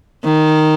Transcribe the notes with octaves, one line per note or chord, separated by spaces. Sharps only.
D#3